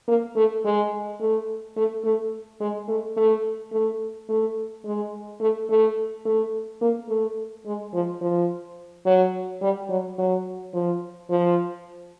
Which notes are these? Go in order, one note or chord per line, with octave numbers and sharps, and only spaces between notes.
A#3
A3
G#3
A3
A3
A3
G#3
A3
A3
A3
A3
G#3
A3
A3
A3
A#3
A3
G#3
F3
F3
F#3
G3
F#3
F#3
F3
F3